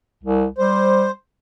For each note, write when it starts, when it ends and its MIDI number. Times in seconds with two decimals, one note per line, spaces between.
0.23 0.46 36
0.58 1.07 55
0.58 1.11 72